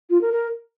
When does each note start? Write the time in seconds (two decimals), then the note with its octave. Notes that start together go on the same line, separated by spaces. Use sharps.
0.10 F4
0.21 A#4
0.32 A#4